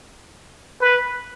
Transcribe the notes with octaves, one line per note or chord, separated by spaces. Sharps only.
B4